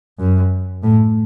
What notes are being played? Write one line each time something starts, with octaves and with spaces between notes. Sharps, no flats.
F#2
A2